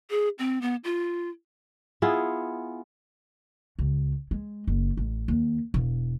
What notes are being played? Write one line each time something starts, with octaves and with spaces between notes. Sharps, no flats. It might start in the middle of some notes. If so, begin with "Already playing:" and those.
G#4
C4
B3
F4
B3 E4 F4 G#4
C#2
G#3
F#1
A1
D#2
E1